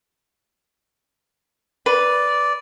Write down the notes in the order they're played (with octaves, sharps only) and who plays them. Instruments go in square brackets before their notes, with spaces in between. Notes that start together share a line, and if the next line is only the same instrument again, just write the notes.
[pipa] B4 [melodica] D5